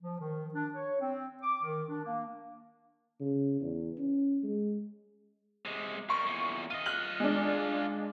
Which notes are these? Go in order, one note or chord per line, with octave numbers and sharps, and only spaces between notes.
F3
D#3
D4
C#5
C4
D6
D#3
D4
A#3
C#3
E2
C#4
G#3
C3 G#3
G3 A#4 C#6
E2 A#2
F4 D#5 D#7
F6 F#6 F#7
G#3 D4